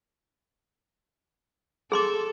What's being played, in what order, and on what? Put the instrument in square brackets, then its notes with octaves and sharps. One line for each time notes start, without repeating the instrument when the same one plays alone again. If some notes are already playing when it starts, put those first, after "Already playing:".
[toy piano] G#4 C6 D6 [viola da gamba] A4